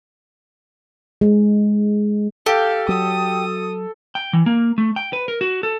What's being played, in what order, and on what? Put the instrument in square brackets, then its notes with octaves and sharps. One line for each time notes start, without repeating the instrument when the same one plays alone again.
[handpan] G#3
[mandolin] G4 [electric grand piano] A4 [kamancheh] F5
[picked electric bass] F#3 [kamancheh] D#6
[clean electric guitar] G5
E3
A#3
A3
G5
B4
A#4
F#4
A4